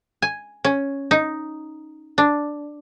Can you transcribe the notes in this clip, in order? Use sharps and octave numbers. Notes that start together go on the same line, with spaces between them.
G#5
C#4
D#4
D4